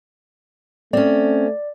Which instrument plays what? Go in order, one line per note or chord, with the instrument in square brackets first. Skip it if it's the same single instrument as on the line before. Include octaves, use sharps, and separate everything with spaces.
[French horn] A3 [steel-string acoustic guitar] C4 C#4 [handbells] D5